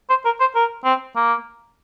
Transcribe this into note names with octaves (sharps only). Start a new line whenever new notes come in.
C5
A#4
C5
A#4
C4
A#3